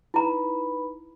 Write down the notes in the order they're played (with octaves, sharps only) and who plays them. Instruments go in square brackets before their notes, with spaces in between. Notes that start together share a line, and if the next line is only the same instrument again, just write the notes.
[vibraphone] D#4 B4 B5 [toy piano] E4 A#5